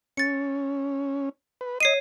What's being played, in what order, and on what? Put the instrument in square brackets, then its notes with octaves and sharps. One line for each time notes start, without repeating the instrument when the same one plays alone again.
[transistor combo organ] C#4 [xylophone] A6 C#7
[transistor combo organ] B4
[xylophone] C#5 C7 D#7 [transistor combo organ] D#5